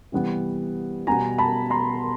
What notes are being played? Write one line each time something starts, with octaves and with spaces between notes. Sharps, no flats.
C3 E3 G3 B3
B2 G3 B3 G#5 A#5
A5 B5
A#5 C6